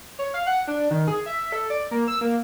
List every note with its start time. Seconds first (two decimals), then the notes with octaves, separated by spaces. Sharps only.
0.19 C#5
0.34 F5
0.46 F#5
0.67 D4
0.91 D#3
1.07 G#4
1.26 E5
1.52 A4
1.70 D5
1.91 A#3
2.08 E6
2.21 A#3